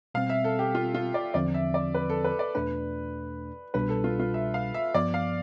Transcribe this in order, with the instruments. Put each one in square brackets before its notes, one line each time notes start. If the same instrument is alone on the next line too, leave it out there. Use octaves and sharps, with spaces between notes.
[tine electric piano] B2 G3 C4 [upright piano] F5
[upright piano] E5
A4
G4
F4
F4
D5
[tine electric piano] E2 D3 F3 C4 [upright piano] D5
[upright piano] E5
D5
B4
A4
B4
D5
[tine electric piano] E2 B2 A3 D4 [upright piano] B4
[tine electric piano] C2 B2 G3 D4 [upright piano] B4
[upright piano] A4
F4
F4
E5
F5
E5
[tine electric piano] G2 F3 B3 [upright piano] D5
[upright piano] F5